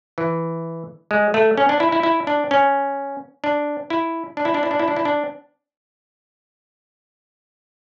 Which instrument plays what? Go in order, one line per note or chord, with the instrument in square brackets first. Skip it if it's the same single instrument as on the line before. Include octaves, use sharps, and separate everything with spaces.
[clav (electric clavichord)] E3
G#3
A3
C#4
D4
E4
E4
E4
D4
C#4
D4
E4
D4
E4
D4
E4
D4
E4
D4
E4
D4